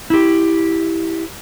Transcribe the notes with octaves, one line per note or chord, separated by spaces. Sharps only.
E4 G4